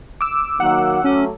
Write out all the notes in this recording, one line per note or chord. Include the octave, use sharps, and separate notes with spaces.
D6 E6
D#3 F#3 A#3 F#5
F#3 A3 C#4